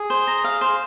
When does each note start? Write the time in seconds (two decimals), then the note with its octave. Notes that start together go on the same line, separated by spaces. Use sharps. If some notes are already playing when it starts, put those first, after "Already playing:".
Already playing: G#4
0.10 C5
0.27 A#5
0.44 F5
0.61 C5